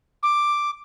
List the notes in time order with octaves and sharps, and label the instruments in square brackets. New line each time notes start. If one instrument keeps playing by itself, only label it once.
[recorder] D6